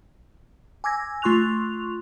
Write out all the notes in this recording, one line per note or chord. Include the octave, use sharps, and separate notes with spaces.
G#5 D6 E6 G#6 A#6
A3 F4 C6 C#6 F#6 F7